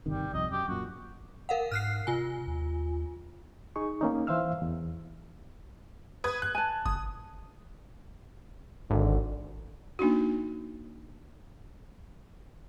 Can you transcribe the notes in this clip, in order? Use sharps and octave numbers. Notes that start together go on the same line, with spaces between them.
G1 C3 D#3 G3
C2 F2 D#5
F#2 G4
F#2 A#2 F#4
A#4 F5 F#5
G#2 F6 F#6 C7
C3 F4 G#5
D#2
D#4 G#4 C#6
A#3 C#4 D#4
E3 C5 E5 F5 E6 F6
E2
B4 D#6 G#6
F#6
G#5 A5
F#1 D#6
G#1 D3
A#3 D4 D#4 F#4